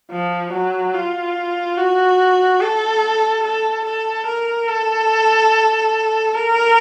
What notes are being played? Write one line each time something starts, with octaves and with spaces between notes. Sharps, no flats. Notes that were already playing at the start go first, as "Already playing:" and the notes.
F3
F#3
F4
F#4
A4
A4
A4
A#4
A4
A#4